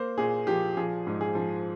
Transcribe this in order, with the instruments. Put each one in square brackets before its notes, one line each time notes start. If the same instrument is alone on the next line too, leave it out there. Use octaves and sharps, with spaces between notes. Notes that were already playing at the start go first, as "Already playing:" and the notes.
Already playing: [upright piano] A#3 C5
A#2 G#4
F3 G4
F3 G#4
G#2
G#4
F3